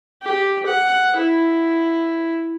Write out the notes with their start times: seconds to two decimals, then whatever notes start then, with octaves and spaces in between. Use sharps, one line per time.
0.22 G4
0.66 F#5
1.17 E4